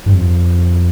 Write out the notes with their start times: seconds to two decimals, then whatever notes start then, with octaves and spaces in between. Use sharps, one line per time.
0.06 G2
0.13 F2